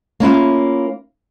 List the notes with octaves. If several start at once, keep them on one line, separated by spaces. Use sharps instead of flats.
A#3 C#4 E4 F4